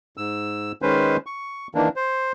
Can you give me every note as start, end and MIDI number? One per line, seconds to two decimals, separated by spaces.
0.17 0.72 44
0.17 0.72 88
0.82 1.17 51
0.82 1.17 56
0.82 1.17 61
0.82 1.17 71
0.82 1.17 72
1.26 1.67 85
1.75 1.88 51
1.75 1.88 52
1.75 1.88 58
1.75 1.88 62
1.96 2.32 72